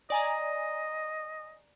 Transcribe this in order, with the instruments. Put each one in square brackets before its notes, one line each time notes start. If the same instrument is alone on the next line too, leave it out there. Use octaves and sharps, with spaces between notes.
[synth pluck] D5 G#5 A#5 [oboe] D#5